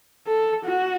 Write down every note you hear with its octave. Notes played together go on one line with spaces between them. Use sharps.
A4
F#4